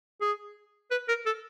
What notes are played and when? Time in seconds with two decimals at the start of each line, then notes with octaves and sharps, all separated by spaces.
0.21 G#4
0.91 B4
1.09 A#4
1.26 A4